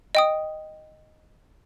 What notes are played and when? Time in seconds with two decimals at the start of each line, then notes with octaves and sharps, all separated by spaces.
0.15 D#5 G5 D#6